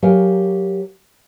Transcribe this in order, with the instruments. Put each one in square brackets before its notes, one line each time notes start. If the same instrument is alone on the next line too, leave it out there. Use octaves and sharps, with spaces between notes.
[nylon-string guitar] F#3 G4 A#4 C#5 F5 G#5